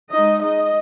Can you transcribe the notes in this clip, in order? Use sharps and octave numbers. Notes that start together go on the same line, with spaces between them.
G#3 D#4 D#5
D#5